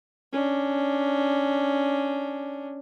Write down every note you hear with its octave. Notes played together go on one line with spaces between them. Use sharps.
C#4 D4